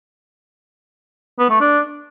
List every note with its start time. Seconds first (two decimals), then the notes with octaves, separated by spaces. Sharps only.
1.39 B3
1.50 A3
1.61 D4